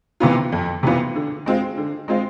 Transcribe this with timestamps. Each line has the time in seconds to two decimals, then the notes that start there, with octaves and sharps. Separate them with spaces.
0.20 C3 E3 B3 F4
0.52 F2
0.83 C3 E3 B3 F4
1.15 D3
1.46 G#3 C4 F4
1.77 D3
2.08 G#3 C4 F4